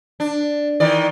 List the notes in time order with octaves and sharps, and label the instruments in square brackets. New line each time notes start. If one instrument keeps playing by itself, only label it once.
[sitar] D4
D#3 E3 D5